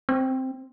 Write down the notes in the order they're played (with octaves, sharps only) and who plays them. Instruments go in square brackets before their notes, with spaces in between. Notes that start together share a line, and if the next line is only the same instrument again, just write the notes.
[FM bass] C4